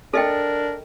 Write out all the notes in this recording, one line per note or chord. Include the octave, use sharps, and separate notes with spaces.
D4 A4 A#4 D#5 G5